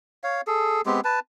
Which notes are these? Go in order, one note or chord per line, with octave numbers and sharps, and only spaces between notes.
C#5 F5
G#4 A4
G#3 B3 C4 G4
B4 A5